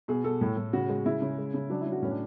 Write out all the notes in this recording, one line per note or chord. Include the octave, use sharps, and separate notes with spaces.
B2 G#4
B2 A4
A2
A2
C#3 F#4
G#3
C#3 E4
C#3
G#3
C#3
F#3 D4
E4
F#3
F#4
A2 C#4
D4